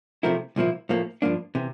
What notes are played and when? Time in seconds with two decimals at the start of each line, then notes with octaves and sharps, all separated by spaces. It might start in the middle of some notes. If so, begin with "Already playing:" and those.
0.23 C3 F3 A3 E4 A#4
0.56 C2 A#2 F3 A#3 E4
0.89 A2 F3 A#3
1.22 G2 F3 A#3 D4
1.55 C3 E3